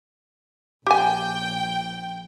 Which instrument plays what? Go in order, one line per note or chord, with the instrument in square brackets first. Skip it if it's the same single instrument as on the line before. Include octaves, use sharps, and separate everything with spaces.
[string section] A#1 G5 [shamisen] G4 G#5